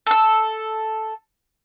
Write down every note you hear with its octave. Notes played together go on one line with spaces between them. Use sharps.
A4 E6